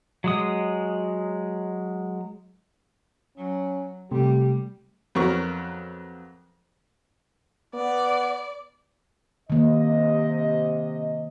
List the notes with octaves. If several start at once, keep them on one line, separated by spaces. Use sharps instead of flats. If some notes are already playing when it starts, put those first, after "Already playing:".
F#3 G#3 D#6
F#3 C#4
C3 G3 A3 G4
F2 F#3 B3 A#4 C#6
B3 D5
C3 D#3 A#3 D#5